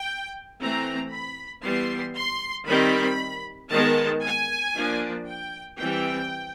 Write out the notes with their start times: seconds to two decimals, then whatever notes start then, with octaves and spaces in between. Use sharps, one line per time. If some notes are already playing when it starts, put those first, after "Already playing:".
Already playing: G5
0.60 E3 A3 C4 A#5
1.11 B5
1.63 E3 G3 B3 C6
2.15 C6
2.67 D#3 G3 C4 B5
3.71 D#3 G#3 B3 A5
4.23 G#5
4.75 F3 A#3 D4
5.27 G5
5.79 E3 G3 C4 G5